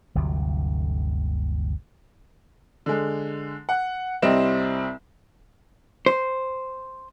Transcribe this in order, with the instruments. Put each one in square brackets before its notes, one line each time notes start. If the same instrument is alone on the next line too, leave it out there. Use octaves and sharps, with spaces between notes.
[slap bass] G1 D2 C3 F#3
[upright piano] D3 G#3
F#5
C2 G3 C4 E4 D#5 E7
[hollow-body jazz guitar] C5